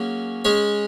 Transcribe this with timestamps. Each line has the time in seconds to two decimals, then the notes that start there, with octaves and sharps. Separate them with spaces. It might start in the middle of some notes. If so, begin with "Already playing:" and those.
Already playing: F#3 A#3 C#4 G#4
0.45 G#3 C#4 G#4 C#5